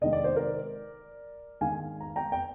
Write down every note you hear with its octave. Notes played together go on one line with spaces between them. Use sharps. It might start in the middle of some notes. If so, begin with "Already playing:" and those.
C3 D#3 G#3 D#5
D5
C5
A#4 D5
G#2 D#3 G#3 F5 G#5
A#5
G5 A#5
G5